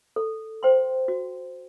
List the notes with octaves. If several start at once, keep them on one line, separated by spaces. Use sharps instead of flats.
A4
C5 G5 C6
F#4